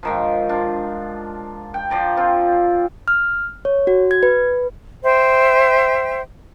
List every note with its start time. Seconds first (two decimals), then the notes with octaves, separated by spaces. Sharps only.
0.03 G#2 D#3 F3
0.49 D4 F4
1.74 G5
1.90 F3 D5 A#5
2.17 F3 C4 F4
3.08 F6
3.65 C#5
3.87 F#4
4.11 G#6
4.23 B4
5.04 C5 E5 G5